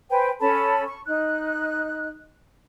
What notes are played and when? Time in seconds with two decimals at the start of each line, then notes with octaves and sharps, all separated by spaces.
0.10 B4 C5 G5 G#5
0.40 C#4 A4 A5 B5
0.86 C#6
1.06 D#4 F#6